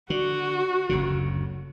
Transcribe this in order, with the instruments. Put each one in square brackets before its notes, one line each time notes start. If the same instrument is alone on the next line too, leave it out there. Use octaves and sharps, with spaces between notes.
[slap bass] D3 [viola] F#4
[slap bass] F#1 D2 C#3